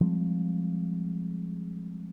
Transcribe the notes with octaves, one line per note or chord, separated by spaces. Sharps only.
F3 G3 G#3 C4